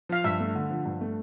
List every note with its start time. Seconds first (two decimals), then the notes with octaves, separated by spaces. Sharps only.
0.09 F3 F5
0.24 G2 E5
0.40 A3
0.55 D3
0.71 F3
0.86 G2
1.01 A3